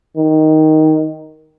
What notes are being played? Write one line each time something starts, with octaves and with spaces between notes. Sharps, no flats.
D#3